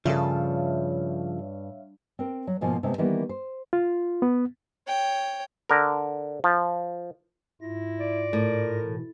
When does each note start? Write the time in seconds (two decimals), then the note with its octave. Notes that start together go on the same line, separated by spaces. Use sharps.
0.05 G2 C#3 F3 A4 C#5 E5 F5
2.19 C4 A#4
2.47 F#3
2.61 G#2 B2 F3 A#3 G#5
2.83 C3 G#3 A3 B3
2.98 D#3 E3 G3 A#3 B3
3.29 C5
3.73 F4
4.22 B3
4.87 C#5 G5
5.69 D3 A#4
6.44 F3
7.61 G#2 E4 F4 A#6
8.00 D5
8.33 A2 A#4
8.82 B2 E3